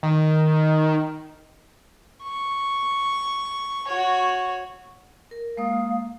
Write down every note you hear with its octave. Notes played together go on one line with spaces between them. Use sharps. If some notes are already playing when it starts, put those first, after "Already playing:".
D#3
C#6
F#4 C#5
A#4
G#3 A#3 F5 D#6